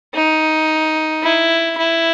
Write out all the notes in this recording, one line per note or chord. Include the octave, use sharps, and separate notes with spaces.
D#4
E4
E4